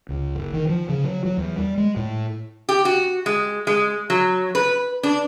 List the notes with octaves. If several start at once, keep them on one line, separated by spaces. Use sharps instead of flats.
C#2
F#1
D#3
F3
C#3
F#3
F#3
E2
G3
G#3
A2
G4
F#4
G#3
G#3
F#3
B4
D4